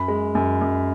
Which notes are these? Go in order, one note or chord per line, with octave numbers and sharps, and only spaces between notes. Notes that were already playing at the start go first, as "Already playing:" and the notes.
Already playing: F#2 B5
G#3
F#2
F#2